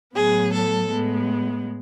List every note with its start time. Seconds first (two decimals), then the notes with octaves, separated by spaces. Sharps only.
0.15 A2 F#3 B3 G#4
0.52 A4
0.90 A2 G#3 B3